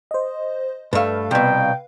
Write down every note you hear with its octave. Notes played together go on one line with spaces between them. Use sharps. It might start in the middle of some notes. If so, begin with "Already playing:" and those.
C5 D#5
G2 A3 B4 F5
C2 B2 G5